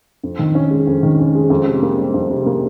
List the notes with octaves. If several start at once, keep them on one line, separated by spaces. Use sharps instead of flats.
F2
D#3
C#4
G#3
F2
D#3
C#4
G#3
F2
C3
A#3
G3
F2
C3
A#3